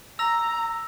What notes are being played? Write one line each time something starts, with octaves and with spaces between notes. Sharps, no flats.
A#5 E6 A#6 F7